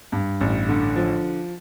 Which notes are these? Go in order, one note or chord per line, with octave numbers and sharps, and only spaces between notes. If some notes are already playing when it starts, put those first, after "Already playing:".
G2
A1
D3
F3